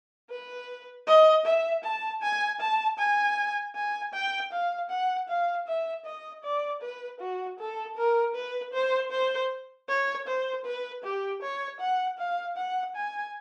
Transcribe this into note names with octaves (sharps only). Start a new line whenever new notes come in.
B4
D#5
E5
A5
G#5
A5
G#5
G#5
G5
F5
F#5
F5
E5
D#5
D5
B4
F#4
A4
A#4
B4
C5
C5
C#5
C5
B4
G4
C#5
F#5
F5
F#5
G#5